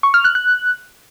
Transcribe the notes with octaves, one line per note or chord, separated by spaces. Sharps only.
C#6
F6
F#6
F#6